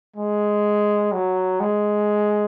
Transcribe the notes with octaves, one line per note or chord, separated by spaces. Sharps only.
G#3
F#3
G#3